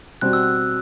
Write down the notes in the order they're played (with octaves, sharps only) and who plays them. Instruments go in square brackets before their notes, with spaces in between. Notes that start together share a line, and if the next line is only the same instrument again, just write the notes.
[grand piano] B2 G3 C4 F#4 [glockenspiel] F#6
[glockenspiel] E6
F#6